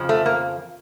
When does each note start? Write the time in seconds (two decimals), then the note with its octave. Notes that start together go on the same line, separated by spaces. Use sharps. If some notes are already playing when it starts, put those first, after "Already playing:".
Already playing: F2 C#3 F3
0.09 A3
0.26 A#3